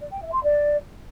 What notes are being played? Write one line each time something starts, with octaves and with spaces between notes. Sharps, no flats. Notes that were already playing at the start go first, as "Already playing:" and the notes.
D5
G5
E5
C6
D5